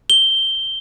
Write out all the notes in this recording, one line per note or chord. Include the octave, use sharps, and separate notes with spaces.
G7